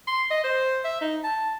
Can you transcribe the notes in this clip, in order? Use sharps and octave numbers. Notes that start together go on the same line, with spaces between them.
C6
D#5
C5
E5
D#4
A5